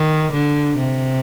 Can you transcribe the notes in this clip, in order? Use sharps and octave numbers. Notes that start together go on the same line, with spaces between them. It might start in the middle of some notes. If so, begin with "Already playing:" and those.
Already playing: D#3
D3
C3